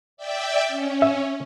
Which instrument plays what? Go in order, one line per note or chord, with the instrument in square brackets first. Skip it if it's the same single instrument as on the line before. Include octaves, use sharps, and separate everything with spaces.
[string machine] D5 E5 G5
C#4
[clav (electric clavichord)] E5